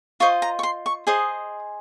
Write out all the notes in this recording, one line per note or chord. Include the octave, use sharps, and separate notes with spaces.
F4 C5 D#5 C#6
A#5
C#6
C6
C#6
G#4 C5 D#5 D#6